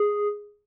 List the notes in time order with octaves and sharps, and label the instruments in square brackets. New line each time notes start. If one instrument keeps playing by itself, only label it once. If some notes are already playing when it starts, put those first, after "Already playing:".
Already playing: [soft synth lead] G#4